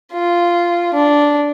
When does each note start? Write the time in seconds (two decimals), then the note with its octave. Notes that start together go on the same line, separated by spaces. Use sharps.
0.13 F4
0.94 D4